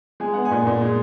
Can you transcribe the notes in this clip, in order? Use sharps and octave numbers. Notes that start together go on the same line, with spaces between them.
G#3 G#5
B3 F#5
G#5
A#2
A#2
G#3